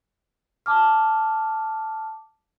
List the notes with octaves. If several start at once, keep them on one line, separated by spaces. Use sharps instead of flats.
A5 D6 F6